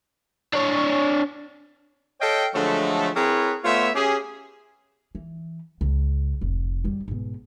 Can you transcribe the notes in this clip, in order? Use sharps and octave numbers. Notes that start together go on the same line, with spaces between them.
D4 C#5
A4 C#5 D#5 F5 G5
D3 F3 F#3 G#3 A3
C4 E4 G#4 A#4 B4 C#5
A3 B3 F4 C5 C#5 E5
C#4 G4 G#4
E3
C#2
F1
F#2 G3
G#2 B2